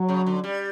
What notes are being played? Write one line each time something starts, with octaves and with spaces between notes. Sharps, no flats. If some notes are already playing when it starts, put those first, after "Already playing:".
Already playing: F#3
C#3
D3
G3